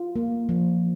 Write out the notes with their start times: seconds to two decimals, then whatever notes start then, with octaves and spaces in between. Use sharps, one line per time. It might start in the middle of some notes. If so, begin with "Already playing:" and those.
Already playing: F4
0.16 A#3
0.49 F3